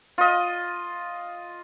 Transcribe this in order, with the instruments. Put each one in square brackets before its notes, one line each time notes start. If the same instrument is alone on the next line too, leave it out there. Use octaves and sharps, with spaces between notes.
[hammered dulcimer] F4 D#5